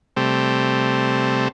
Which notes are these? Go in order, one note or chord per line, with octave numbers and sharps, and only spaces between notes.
C3 G3 A3 C4